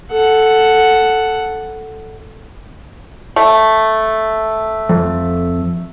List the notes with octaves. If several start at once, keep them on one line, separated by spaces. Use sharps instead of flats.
A4 F#5
A3
F2